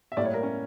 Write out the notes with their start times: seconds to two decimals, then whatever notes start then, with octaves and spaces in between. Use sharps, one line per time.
0.12 E5
0.17 A2 G3 A#3 D5
0.25 C#5
0.34 A#4
0.43 C#4